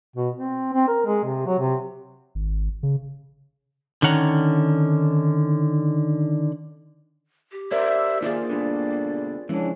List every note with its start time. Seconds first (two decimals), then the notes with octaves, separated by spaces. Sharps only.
0.16 B2
0.36 C4
0.73 C4
0.88 A#4
1.06 G#3
1.24 C3
1.46 F#3
1.59 C3
2.35 G#1
2.83 C#3
4.02 D3 D#3 C#4 F#5 A#5
7.52 G4
7.72 A#4 C5 D5 E5
8.23 D#3 A#3 F4 G#4 D5
8.49 G2 B2 D3
9.49 E3 F3 G#3 C#4 D4